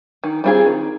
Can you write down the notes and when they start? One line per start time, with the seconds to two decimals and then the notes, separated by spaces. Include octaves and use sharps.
0.24 D#3
0.44 G3 C4 F4 G#4
0.66 D#3